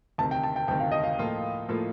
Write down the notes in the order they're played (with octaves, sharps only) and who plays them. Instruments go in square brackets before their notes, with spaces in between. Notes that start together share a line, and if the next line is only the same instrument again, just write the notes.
[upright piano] D2 C3 D#3 [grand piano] A5
[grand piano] G5
A5
G5
[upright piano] D2 C3 D#3 [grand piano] G5
[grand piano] F5
D#5
F5
[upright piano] A2 F3 A#3 F4 A4
A2 F3 A#3 F4 A4